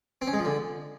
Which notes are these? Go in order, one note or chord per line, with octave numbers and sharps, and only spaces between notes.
C4
C#4
G#3
F3
D3